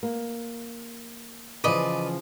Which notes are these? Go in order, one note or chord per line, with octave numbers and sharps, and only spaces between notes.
A#3
C#3 E3 F3 B4 D5 D#5